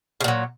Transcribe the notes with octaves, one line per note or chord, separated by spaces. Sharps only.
A#2 C#3 F#3